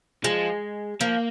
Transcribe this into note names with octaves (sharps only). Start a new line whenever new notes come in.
F3 G#3
F3 A#3